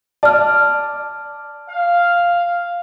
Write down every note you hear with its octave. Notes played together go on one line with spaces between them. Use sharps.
D5 A5 F6
F5